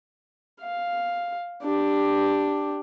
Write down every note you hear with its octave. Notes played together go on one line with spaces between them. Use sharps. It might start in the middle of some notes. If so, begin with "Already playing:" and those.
F5
D4 G4